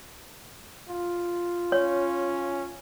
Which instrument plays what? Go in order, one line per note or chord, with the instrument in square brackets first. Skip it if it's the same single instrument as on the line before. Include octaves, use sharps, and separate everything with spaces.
[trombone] F4
[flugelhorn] C#4 [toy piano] C#5